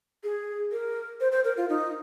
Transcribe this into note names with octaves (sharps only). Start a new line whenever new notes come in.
G#4
A#4
C5
C5
A#4
F4
D#4